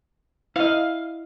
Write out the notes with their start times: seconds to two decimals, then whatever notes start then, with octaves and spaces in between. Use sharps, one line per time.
0.56 E4 D#5 F5